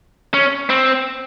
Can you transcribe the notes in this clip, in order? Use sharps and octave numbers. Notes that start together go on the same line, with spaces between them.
C#4
C4